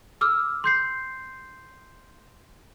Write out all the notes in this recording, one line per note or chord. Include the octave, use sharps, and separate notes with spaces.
D6 E6 F6
C6 G6 C7